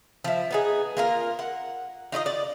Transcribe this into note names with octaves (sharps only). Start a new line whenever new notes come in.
F3 E4
B3 D#4 G#4
A#3 F4 A#4
F#5
D#4 F4 C#5 D#5
D5